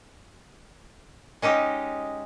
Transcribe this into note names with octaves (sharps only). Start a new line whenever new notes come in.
G#3 C#4 D#4 G4